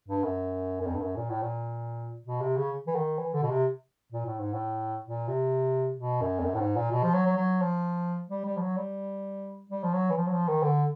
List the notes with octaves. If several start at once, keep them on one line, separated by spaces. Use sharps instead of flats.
G2
F#2
F#2
F2
G2
F#2
A#2
A2
A#2
B2
C3
C#3
E3
D#3
E3
D3
B2
C3
A#2
A2
G#2
A2
A#2
C3
B2
F#2
F2
F#2
A2
G#2
A#2
B2
F3
F#3
F#3
F#3
F3
G3
G3
F3
F#3
G3
G3
F3
F#3
E3
F3
F#3
F3
D#3
D3